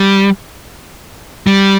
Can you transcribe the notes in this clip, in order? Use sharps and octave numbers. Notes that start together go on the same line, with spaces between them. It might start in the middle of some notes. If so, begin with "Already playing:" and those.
Already playing: G3
G3